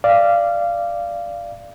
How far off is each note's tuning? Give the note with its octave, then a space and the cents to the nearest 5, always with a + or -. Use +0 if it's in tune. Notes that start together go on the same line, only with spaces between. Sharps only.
D5 +0 F5 -20